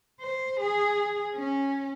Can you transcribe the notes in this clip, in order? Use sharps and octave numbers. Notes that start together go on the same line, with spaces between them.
C5
G#4
C#4